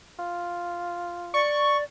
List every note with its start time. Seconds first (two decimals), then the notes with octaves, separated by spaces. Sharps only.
0.19 F4
1.34 D5 C#6